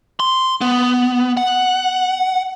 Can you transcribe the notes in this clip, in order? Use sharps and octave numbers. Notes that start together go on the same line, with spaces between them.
C6
B3
F#5